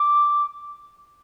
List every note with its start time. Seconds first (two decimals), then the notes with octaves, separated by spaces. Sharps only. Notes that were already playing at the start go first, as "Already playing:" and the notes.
Already playing: D6